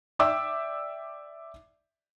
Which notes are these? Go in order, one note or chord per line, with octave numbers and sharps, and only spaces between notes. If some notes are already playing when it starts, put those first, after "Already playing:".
D5 E5 G5 D6 E6